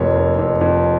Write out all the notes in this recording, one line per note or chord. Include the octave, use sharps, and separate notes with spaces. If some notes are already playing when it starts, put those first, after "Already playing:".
Already playing: F1 F2 A#3 C#5
A#3
F2
F2